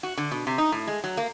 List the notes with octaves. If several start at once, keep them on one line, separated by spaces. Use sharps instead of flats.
F#4
D3
B2
C3
D#4
A2
G#3
F#3
A#3